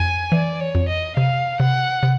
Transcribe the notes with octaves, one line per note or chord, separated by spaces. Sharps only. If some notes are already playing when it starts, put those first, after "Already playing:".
Already playing: F2 G#5
E3 D5
C#5
F2
D#5
C3 F5
C3 F#5
C3